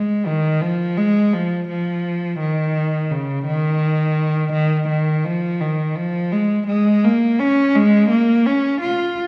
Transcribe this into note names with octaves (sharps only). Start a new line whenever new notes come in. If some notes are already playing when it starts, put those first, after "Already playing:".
Already playing: G#3
D#3
F3
G#3
F3
F3
D#3
C#3
D#3
D#3
D#3
F3
D#3
F3
G#3
G#3
A#3
C#4
G#3
A#3
C#4
F4